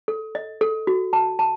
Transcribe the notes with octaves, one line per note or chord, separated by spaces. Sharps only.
A4
D#5
A4
F#4
A5
A5